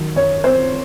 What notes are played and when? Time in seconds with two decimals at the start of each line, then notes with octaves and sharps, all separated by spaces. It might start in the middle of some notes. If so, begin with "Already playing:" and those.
Already playing: D#3 F#3
0.16 F#2 C#5
0.44 C4 C5